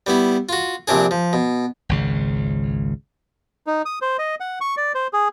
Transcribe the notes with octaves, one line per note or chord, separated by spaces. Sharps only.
G3 B3 E4
F4 F#4
A#1 C3 D4 G#4
F3
B2
G#1 C#2 C#3
D#4
D#6
C5
D#5
F#5
C#6
D5
C5
G#4